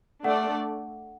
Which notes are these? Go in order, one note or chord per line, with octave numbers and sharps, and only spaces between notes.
A3 D4 A4 D5 F#5